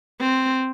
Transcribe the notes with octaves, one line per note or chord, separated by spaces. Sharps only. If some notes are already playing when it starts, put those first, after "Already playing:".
C4